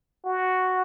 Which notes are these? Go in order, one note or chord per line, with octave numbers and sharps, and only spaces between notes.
F#4